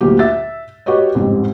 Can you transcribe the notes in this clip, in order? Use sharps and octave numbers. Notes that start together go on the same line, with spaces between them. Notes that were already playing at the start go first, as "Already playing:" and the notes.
D2 A#2 F#3 G4
E5 A6
F#4 G4 B4 C#5 D#5
A1 F2 G#2 G3